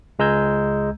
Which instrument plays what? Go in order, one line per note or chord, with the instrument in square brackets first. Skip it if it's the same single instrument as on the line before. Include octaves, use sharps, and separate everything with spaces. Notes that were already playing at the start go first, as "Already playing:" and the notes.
[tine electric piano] C#2 G#3 A#5 E6 G6 G#6